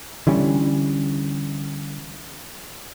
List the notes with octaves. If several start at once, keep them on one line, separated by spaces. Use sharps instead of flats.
D3 E3 G3 C#4